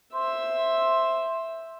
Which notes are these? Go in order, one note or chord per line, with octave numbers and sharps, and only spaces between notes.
C5 E5